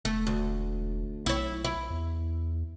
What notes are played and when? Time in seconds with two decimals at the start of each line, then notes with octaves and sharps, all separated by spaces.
0.05 E1 A3
0.27 D2
1.26 B1 E4 C#5
1.65 E4
1.90 E2